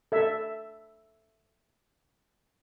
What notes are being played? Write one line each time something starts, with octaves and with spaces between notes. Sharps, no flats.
A4 E5